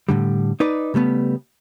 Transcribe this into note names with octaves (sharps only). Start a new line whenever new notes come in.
A2 D3 G3
D#4 B4 D5
C#3 G3 A3 B3